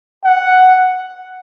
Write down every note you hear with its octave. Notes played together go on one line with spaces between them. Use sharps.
F#5